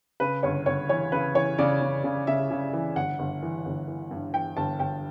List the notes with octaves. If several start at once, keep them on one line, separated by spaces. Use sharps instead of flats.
C#3 B4
G1 C#5
G1 C#5
E3 C#5
C#3 B4
E3 C#5
C#3 D5
C#3
C#3
C#3 E5
C#3
E3
G1 F#5
G1
E3
G1
E3
G2
E3 G5
G1 A5
G1 G5